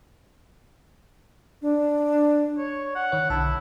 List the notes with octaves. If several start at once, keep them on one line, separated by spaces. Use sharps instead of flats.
D4
C#5
F#5
D#3 C#5
B1 D3 E4 A5